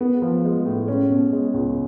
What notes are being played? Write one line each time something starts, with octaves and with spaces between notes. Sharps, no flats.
B3
F3
G#3
A2
C#4
B2
G#3
C#2